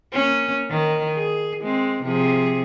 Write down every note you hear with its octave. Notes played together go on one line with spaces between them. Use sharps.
A#3 C#4
D#3
G#4
G#3 C4
C3 F3 G#4